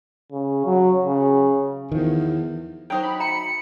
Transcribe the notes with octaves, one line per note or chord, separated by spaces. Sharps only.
C#3
F#3
C#3
E2 D#3 F3
F#3 D#4 C5 G5
B5
G5 A#5 C#7